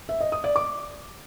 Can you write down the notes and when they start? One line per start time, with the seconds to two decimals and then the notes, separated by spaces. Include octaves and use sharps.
0.09 E5
0.21 D#5
0.32 D#6
0.44 D5
0.56 D6